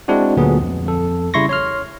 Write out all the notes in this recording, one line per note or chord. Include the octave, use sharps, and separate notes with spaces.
G#3 C4 D4 E4 F#4
D2 A#2 D3 F#3 B3 G#4
F2
F2 A4
C#3 G3 E4 C6 C#6 A#6
C#5 C6 F6